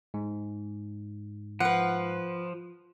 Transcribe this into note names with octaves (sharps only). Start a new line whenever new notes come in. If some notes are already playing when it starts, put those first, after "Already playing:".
G#2
F3 B4 F#5